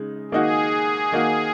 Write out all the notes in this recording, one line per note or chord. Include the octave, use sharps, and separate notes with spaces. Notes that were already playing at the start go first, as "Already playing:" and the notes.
Already playing: C#3 G#3 D#4
D#3 A#3 D#4 F#4 G#4
D#3 A#3 D#4 F#4